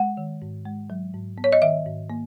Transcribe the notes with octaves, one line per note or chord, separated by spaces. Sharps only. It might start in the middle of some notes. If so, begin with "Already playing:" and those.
Already playing: G#3 F#5
D#3
G#2
G#3
F#3
G#2
B3
C#5
D#5
D#3 E5
G#2
A#3